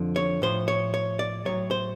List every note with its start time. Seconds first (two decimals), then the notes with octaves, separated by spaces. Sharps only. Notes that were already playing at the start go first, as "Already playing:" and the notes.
Already playing: F2 D3 F3
0.16 C#5
0.42 A2 F3 C5
0.68 C#5
0.94 C#5
1.19 D5
1.45 A2 F#3 C#5
1.71 C5